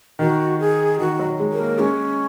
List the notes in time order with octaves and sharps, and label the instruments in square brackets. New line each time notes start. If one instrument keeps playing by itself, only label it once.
[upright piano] D#3 [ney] F#4
[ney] G#4
[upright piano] D#3 [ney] F#4
[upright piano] F#3
G#3
[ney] A#4
[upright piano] A#3
[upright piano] G#3 [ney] C#4